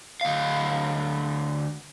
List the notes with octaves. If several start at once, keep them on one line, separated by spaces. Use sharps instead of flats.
D2 F5